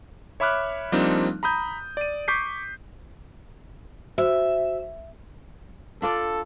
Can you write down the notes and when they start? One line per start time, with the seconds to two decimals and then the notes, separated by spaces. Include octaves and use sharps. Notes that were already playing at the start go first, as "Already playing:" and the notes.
0.40 C#5 E5 B5 D6 F6 F#6
0.92 F3 G3 A#3 C4 D4 D#4
1.43 A#5 B5 D#6 G6
1.97 D5 D#7
2.28 C#6 D6 G6 B6 C7
4.18 F#4 C5 E5
6.02 D4 F4 A4 D5